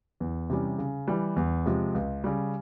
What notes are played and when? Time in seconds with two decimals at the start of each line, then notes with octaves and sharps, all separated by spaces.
0.20 E2
0.50 C3 E3 G3 C#4
0.78 C#3
1.08 E3 G3
1.36 E2
1.66 C3 F3 G#3
1.94 C#2
2.24 C#3 G3